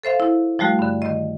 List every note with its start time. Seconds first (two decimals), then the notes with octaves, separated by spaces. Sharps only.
0.03 A4 C5 E5 F5
0.20 E4
0.59 F3 G3 A3 F#4
0.79 G2 D3
1.02 D#3 D#5